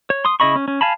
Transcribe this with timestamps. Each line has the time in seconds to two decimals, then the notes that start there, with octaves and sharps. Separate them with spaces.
0.10 C#5
0.25 C6 D#6
0.40 C#3 E4 D#5 B5 C#6
0.56 C#4
0.68 C#4
0.81 F5 G#5 A5 B5